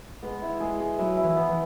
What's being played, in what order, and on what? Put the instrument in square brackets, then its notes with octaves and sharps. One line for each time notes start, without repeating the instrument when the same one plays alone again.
[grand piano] G#3 [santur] B3
[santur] E4
[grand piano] G#3 [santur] G#4
[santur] G#4
[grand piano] F#3 [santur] E4
[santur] E4
[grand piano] E3
[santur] B3
[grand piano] E3